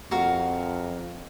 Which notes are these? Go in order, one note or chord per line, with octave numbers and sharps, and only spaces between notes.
F2 F#4 A#4 F5